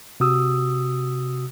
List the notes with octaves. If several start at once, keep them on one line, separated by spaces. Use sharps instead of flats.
C3 F#4 D#6 E6